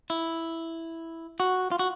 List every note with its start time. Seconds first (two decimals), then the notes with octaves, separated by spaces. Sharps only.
0.10 E4
1.40 F#4
1.72 F4
1.79 F#4